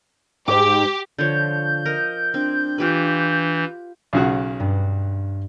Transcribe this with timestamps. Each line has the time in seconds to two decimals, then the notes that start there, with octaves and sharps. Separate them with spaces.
0.48 G#2 G4 D6
1.18 D3 F3 C#5 G6
1.85 A#4 D#5
2.34 C4 D4
2.78 E3 F4 G4 B4
4.13 B1 C#3 F#4 C7
4.60 G2